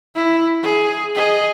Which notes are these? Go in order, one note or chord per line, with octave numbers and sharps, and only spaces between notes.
E4
G#4
G#4 D#5